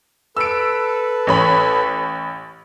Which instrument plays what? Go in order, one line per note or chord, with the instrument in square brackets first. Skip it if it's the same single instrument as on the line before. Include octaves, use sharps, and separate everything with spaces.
[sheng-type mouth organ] A4 B4 [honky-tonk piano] E6 D7
[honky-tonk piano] A1 C#5 B5